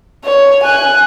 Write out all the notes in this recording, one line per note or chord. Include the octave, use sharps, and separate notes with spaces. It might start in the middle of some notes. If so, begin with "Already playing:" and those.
C#5
G#5 F#6